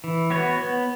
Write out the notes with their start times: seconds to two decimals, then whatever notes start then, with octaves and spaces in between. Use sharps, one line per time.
0.04 E3
0.30 B3 F#4 C#5
0.58 B3